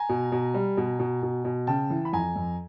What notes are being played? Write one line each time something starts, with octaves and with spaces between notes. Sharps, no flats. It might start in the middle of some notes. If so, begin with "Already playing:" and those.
Already playing: G#5 A#5
B2
B2
G3
B2
B2
B2
B2
C#3 G5 A5
E3
B5
F2 G#5 A#5
F2